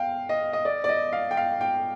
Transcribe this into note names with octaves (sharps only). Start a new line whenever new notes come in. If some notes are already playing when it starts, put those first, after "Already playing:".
Already playing: F5 G5
D#5
D#5
D5
D5
D#5
F5
G5
F5
G5